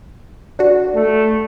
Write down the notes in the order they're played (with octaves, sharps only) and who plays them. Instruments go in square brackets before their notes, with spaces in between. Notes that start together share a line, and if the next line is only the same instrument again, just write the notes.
[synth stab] D4 F#4
[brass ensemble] A3